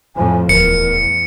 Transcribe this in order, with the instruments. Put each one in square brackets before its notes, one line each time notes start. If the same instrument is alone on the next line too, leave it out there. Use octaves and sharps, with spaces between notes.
[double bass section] F2 A2 F3 [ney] G#5
[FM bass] D1 [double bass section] E2 [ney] A#4 [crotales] C#7